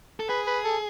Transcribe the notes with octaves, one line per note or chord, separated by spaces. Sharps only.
A4
G#4 B4
B4
A4